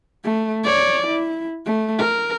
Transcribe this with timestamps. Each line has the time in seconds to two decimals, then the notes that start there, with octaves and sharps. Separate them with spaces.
0.25 A3
0.63 C#5 D5
1.07 E4
1.66 A3
1.98 A#4